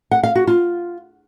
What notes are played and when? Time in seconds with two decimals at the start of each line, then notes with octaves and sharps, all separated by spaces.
0.11 F#5
0.23 F5
0.35 F#4
0.47 F4